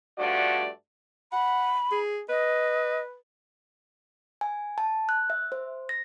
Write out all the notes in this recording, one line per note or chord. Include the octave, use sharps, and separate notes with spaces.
G2 F3 A3 F#4 D5
F#5 B5
G#4
B4 D#5
G#5
A5
F#6
E5
C5
A#6